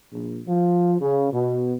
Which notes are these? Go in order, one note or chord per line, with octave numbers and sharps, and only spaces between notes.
A#1
F3
C#3
B2